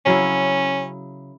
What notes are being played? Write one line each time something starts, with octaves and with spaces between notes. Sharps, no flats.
C#3 F#3 C#4 E4